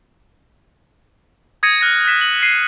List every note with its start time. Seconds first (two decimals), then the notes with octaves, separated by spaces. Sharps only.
1.63 D#6 G#6 A#6 C#7 D#7
1.81 F6 F#6 G#6 A#6
2.05 F#6 A#6 B6 E7
2.21 F#7
2.42 B6 C7 D#7